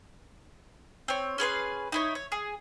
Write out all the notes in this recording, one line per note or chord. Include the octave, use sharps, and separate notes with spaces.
C4 C#5
C#4 G#4 B4 C6
D#4 E4 C#5
C#5
G#4